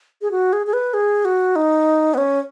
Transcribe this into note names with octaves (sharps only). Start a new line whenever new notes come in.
G#4
F#4
G#4
G#4
B4
G#4
F#4
D#4
B3
C#4